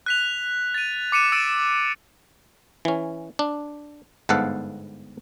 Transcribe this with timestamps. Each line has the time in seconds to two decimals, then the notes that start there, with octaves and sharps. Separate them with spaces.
0.06 F#6 B6 F7
0.74 A6 D#7
1.12 D6 C#7 D#7 E7
1.32 E6 A6 D7 D#7
2.85 E3 C#4
3.39 D4
4.29 G1 G#2 B3 A4 F5 F#5